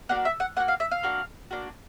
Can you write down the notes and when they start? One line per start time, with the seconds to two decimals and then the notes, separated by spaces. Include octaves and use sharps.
0.09 A#3 D4 F#4 F#5
0.25 E5
0.40 F#5
0.57 A#3 D4 F#4 F#5
0.68 F5
0.80 E5
0.91 F5
1.03 A#3 D4 F#4
1.51 A#3 D4 F#4